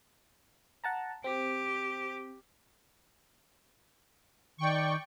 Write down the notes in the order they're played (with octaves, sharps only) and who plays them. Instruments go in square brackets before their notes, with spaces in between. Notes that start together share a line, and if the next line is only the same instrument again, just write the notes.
[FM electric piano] F#5 A5 A#5
[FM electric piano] C4 [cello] G4
[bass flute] D#3 [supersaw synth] D5 G5 C#6